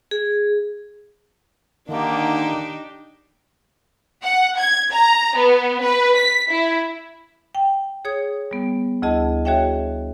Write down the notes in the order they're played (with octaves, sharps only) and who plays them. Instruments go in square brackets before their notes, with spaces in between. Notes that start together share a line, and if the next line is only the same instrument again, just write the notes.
[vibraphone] G#4
[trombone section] D3 A#3 [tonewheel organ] D#3 [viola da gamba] D4 D#4 G4
[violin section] F#5
G#6
A#5
B3
B4
B6
E4
[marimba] G5
G#4 C#5 D#6 G#6
G3 B3
D2 E4 G#4 D#5 A5
F#4 G#4 C#5 E5 G5